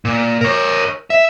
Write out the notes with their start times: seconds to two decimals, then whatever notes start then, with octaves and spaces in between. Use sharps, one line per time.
0.05 A#2
0.41 A#4 C#5
1.10 E5